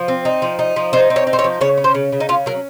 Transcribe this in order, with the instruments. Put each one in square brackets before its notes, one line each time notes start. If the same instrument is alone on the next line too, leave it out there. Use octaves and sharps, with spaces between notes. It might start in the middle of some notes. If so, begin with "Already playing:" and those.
Already playing: [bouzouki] F3
C4
D#4
F3
D#4
F3
D#4 C5
C4
C#5
D#4
C5
C#5
F3
C#3 C#5
C#4
C5
C#3
C#3
D#4
C#4 F4
F#3 A#4